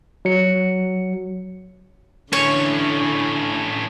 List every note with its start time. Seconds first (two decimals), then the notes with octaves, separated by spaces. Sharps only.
0.25 F#3 C#7
2.33 A2 D3 C#4 C#5